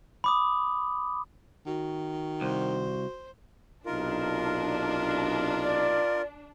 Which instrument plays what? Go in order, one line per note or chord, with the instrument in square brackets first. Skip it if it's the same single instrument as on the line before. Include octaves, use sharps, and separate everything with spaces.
[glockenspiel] B5 D6 D#6
[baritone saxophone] D#3 [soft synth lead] F#4
[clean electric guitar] C2 [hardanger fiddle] C5
[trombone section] B1 C3 D#4 [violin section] D4 [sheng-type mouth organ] F4 A#4
[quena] D5